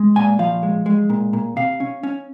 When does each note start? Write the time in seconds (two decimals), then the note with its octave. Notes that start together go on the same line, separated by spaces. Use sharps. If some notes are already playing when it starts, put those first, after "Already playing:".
Already playing: G#3
0.16 A#2 G#5
0.39 F3 F5
0.63 G#3
0.86 G#3
1.10 A#2
1.33 A#2
1.56 C3 F5
1.80 C#4
2.03 C#4